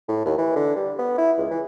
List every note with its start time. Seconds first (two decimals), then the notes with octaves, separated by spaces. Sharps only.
0.09 A2
0.26 D#2
0.38 E3
0.56 D3
0.76 G3
0.99 B3
1.18 E4
1.38 C#2
1.51 E3